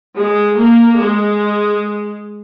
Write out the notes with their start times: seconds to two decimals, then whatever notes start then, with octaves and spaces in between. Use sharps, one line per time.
0.15 G#3
0.56 A#3
0.98 G#3